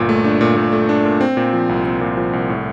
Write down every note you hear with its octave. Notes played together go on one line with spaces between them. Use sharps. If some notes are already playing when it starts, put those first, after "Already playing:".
Already playing: G1 A#2
A3
D4
A#2
A#2
A3
D4
A#2
C4
A#2
F3
C2
C4
A#2
F3
C2
A2